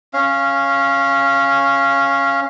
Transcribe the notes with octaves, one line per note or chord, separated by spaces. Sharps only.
C#4 F5